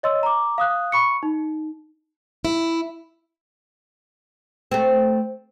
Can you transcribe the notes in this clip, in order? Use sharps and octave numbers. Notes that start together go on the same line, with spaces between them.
C#5 D#5 C6 E6
A#5 D6
F5 D#6 F#6
B5 C#6 C#7
D#4
E4
A3 C4